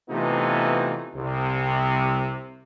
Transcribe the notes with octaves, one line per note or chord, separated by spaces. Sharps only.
C3 E3 A3 B3 D#4 F4
C2 C3